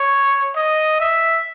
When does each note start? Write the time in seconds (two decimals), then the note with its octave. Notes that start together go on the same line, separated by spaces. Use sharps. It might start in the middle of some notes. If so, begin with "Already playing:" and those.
Already playing: C#5
0.55 D#5
1.00 E5